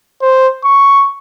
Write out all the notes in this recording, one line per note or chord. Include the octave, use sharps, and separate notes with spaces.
C5
C#6